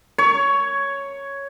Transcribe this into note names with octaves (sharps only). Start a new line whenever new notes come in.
C#5